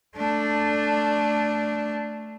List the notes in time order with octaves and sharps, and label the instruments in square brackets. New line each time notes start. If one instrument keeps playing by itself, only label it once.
[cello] A3 D4